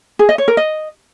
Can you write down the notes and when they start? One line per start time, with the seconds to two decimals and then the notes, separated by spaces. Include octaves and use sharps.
0.19 G#4
0.29 D#5
0.38 C#5
0.48 A#4
0.57 D#5